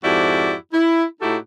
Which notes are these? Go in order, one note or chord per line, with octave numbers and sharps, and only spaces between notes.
F2 G#2 E4 F#4 G4 D5
E4
A2 D#4 E4 F#4 G4 A4